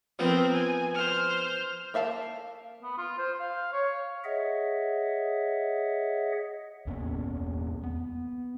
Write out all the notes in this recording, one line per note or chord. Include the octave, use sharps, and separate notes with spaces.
F3 B3 C4 A#4
G#5
C5 F6
A#3 E5 F5 A5
B3
F4
C5
F5
C#5
G#4 C#5 D#5 E5 F#5
E2 A#3 B3 C#4
B3